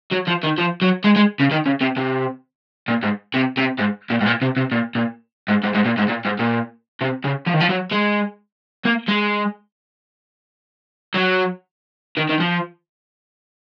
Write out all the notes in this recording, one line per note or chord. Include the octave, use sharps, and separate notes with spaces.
F#3
F3
D#3
F3
F#3
G#3
G#3
C#3
D#3
C#3
C3
C3
A#2
G#2
C3
C3
G#2
A#2
G#2
A#2
C3
C3
A#2
A#2
G#2
G#2
G#2
A#2
G#2
A#2
G#2
A#2
C3
C#3
F3
D#3
F3
F#3
G#3
A#3
G#3
F#3
D#3
D#3
F3